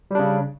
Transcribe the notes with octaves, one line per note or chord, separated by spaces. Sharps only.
C#3 G3 D4